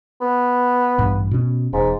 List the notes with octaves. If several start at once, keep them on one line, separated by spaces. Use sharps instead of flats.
B3
A1 G2
B2 C#4
E1 G#2